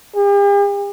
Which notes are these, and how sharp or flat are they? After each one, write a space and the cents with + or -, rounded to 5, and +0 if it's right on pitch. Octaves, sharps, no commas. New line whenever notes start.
G4 +45